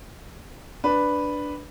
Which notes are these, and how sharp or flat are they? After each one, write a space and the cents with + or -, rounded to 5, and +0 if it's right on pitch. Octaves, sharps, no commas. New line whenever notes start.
D4 +0 B4 +0